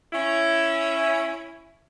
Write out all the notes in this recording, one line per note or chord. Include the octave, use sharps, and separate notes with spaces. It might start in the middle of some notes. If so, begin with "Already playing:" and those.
C#4 E4